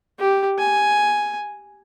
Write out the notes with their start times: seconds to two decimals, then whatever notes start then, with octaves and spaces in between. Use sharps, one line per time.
0.19 G4
0.58 G#5